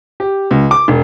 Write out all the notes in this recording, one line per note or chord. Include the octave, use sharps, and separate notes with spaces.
G4
C#2
D6
E1